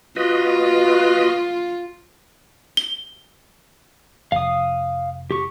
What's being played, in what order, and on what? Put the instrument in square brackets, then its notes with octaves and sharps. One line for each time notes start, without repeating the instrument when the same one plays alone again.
[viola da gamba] F4 [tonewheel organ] F#4 B4 D#5
[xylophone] G7
[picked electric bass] F1 [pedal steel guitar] F5 D#6
[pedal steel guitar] G4 C#6